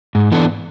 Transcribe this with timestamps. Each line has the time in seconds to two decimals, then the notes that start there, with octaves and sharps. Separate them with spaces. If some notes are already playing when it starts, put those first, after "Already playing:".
0.15 G#2
0.32 E3 B3 D4 A4